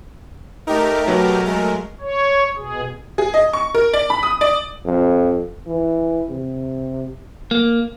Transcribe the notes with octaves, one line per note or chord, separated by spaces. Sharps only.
A3 D#4 G4 A#4
B2 F#3
G#3 A3 A#4
C#5
B2 G#4
G#4
D#5
C#6
A#4
D5
B5
D#6
D5
F2
E3
C3
A#3